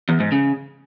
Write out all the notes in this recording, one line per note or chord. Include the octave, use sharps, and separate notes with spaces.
E2
G#2
C#3